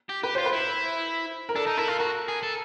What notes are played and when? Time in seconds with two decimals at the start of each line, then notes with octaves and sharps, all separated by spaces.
0.10 G4
0.23 G4 B4
0.35 F4 C5
0.46 B4
0.53 E4
1.49 A#4
1.56 D4 A4
1.67 D#4
1.78 E4 A#4
1.88 F4
1.99 F#4 A#4
2.28 G#4
2.43 A4